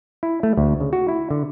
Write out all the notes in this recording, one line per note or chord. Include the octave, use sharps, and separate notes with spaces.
E4
A3
D2
C#3
F#4
E4
D3